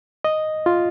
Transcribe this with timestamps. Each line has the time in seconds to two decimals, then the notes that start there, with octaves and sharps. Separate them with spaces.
0.24 D#5
0.66 F4